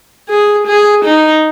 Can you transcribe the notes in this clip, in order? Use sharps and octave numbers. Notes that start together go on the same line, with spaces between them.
G#4
G#4
D#4